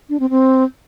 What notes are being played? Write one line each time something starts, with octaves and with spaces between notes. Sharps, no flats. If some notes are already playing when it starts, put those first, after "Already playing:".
D4
C4
C4